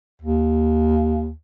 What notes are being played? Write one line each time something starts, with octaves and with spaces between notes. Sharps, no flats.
D#2